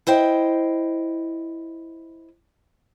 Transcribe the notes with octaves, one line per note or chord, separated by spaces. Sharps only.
E4 C5 D#5 G5